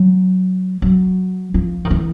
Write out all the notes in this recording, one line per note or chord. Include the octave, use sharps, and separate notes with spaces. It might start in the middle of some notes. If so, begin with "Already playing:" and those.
Already playing: F#3
F#3
F3
D#3
E3